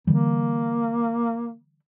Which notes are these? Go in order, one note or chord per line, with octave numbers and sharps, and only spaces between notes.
D3 E3 G3 A#3